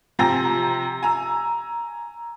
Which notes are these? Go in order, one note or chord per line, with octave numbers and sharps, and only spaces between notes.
C3 F3 G5 G#5 A#5 A#6
G#5 A#5 E6